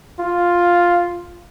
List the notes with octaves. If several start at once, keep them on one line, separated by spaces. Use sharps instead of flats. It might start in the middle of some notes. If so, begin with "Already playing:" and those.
F4